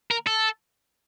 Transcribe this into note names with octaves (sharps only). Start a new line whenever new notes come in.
A#4
A4